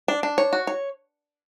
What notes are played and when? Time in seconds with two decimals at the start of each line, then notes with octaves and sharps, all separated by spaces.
0.08 D4
0.23 D4
0.38 C#5
0.53 F#4
0.67 C#5